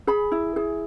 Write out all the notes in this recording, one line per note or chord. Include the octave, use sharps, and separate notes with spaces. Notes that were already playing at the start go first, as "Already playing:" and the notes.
G#4 B5
E4
G#4